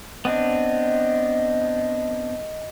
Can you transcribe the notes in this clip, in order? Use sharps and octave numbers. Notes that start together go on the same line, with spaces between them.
B3 C4 D4 D#5